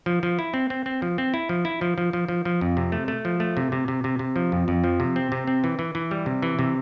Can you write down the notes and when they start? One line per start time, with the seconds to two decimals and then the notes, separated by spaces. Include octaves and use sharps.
0.06 F3
0.23 F3
0.39 E4
0.54 C4
0.70 C4
0.86 C4
1.02 F3
1.18 C4
1.34 E4
1.49 F3
1.65 E4
1.81 F3
1.98 F3
2.13 F3
2.28 F3
2.45 F3
2.61 F2
2.77 C3
2.92 A3
3.08 A3
3.25 F3
3.40 A3
3.57 C3
3.72 C3
3.88 C3
4.04 C3
4.19 C3
4.36 F3
4.52 F2
4.68 F2
4.84 F3
5.00 C3
5.16 C4
5.32 C3
5.47 C4
5.64 E3
5.79 E3
5.95 E3
6.11 G3
6.26 C3
6.42 E3
6.59 C3